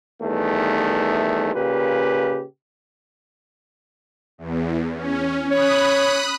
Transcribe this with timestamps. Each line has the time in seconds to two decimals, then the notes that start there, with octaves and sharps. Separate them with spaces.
0.22 E2 G2 D#3 A3
1.55 A#2 C#3 G4 B4
4.38 E2
4.94 C#4
5.51 C#5 B5 D#6 F#6